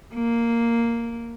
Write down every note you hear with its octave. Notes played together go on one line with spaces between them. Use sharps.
A#3